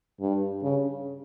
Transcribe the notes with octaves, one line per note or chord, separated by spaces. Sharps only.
G2
C#3